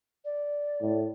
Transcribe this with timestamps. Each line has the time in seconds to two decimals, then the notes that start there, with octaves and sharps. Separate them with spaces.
0.25 D5
0.82 A2